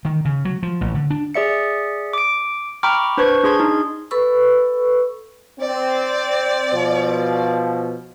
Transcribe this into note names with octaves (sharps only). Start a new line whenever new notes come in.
D#3
C#3
F#3
F3
A1
D3
D4
G#4 D5 E5 C#7
D6 D7
G5 A#5 B5 C#6 D6 F6
D4 B4 C5 C#6 G#6
D4 G#4 C6 G#6
D#4
A4 B4 B5 C#6 E6
C4 D5
B2 F3